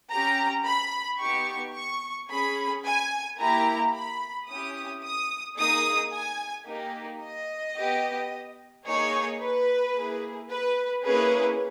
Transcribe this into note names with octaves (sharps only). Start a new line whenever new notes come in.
C#4 G4 A#5
B5
B3 D#4 G4 C#6
C#6
C#4 G#4 B5
G#5
A#3 E4 G4 A#5
B5
C#4 E4 G4 D#6
D#6
A#3 D#4 G#4 D#6
G#5
A#3 D#4 G4
D#5
B3 G4
A#3 D#4 G#4 C#5
B4
A#3 E4 G#4
B4
A#3 C#4 E4 G#4 B4